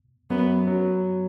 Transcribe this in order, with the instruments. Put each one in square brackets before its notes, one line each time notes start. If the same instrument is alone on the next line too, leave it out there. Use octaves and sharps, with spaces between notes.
[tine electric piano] F#2 F#3 [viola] B3
[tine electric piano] F#3